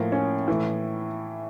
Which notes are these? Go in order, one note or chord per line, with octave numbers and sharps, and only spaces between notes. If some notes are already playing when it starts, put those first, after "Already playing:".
Already playing: A2 F3 A#3
C#4
A2 E3